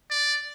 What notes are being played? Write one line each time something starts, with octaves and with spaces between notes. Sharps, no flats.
D5